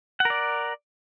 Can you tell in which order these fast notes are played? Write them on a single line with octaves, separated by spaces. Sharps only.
F#5 A#4 D5